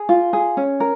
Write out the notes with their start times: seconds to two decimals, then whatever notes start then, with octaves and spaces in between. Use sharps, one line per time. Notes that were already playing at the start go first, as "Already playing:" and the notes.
Already playing: G#4
0.09 F4
0.33 G#4
0.57 C#4
0.80 A#4